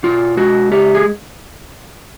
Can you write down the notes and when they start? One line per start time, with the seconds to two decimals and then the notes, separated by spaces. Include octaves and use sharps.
0.03 B2 F4
0.37 G#3 F#4
0.71 C#3 G4
0.95 G#4